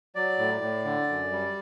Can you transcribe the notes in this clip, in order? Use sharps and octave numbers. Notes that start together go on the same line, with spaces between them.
F#3 D5
A2
A2
D3
F#2
G3